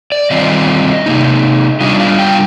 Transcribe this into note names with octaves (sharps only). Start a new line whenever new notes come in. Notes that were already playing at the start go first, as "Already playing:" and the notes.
D5
D#3 G3 C4 F4 D#5
C3 D#3 A#3 D#4
G3 D4 F4 D#5
F5
G5